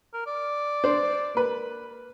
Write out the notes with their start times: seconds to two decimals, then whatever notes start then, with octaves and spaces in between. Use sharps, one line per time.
0.14 A#4
0.26 D5
0.84 D4 C5
1.35 A#3 B4